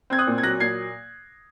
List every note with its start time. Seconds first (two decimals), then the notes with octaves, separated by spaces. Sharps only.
0.10 C4 G#6
0.18 D#6 F#6
0.27 A#2
0.38 G#6
0.43 F#3 F#6 A#6
0.60 A#2 G#6 C7